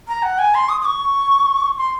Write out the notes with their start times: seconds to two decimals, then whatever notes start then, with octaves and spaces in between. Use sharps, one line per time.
0.08 A#5
0.23 F#5
0.39 G#5
0.55 C6
0.69 D#6
0.81 D#6
0.85 C#6
1.78 C6